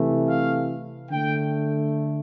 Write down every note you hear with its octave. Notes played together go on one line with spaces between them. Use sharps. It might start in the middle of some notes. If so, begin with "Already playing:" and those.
Already playing: C3 E3 A3
F5
D3 A3 G5